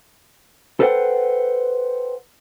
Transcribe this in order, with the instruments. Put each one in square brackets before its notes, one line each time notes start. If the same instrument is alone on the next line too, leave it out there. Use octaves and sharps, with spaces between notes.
[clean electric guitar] A4 B4 C5 D5 F#5 G5